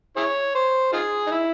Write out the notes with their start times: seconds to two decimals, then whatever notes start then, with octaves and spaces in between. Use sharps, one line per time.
0.16 E4 G#4 C#5
0.55 C5
0.93 D#4 F4 G#4
1.27 D#4
1.31 E4